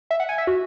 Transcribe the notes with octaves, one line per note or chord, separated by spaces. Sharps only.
E5
F#5
G#5
E5
F#4